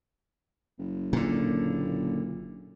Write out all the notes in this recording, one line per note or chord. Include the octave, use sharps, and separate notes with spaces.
F#1
A#2 D3